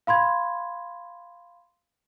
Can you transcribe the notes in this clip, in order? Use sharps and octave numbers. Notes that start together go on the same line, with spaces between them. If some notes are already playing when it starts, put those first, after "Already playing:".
F5 B5 C6 G#6